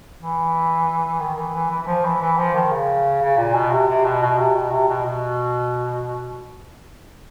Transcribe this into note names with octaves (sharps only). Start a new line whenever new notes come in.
E3
D#3
E3
E3
E3
E3
F3
E3
E3
F3
D#3
C#3
C#3
A#2
B2
C3
C3
B2
B2
C3
B2
C3
B2
B2